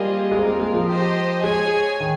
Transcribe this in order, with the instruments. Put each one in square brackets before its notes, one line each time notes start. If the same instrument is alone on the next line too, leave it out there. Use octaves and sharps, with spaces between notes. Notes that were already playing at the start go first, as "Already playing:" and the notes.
Already playing: [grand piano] G3 [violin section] A#3 F4 G#4 C5 D#5
[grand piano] G#3 [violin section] C4 F4 A#4
[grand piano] A#3
G#3
F3
[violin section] G4 C5 D#5
[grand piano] G#3 [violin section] G#4 C#5 G#5
[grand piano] D#3